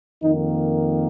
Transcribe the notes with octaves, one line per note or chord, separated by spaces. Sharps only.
F2 D#3 A#3 D#4